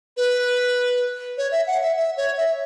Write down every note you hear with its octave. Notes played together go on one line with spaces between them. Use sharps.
B4
C#5
E5
F#5
E5
E5
C#5
E5